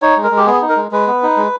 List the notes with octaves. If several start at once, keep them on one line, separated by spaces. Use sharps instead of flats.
D#4 C#5
G#3
A#4
G#3
G4
B3 G#4
D#4
A#4
G#3
G#3 B4
B3
D#4
G#3